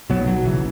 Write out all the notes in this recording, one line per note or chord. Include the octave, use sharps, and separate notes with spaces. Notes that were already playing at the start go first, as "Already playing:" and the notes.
B1 B2 F#3 B3
F#3
F#1 C#3 E3